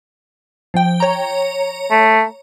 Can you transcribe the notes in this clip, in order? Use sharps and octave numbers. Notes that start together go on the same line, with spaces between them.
F3 G5
C#5 A#5
A3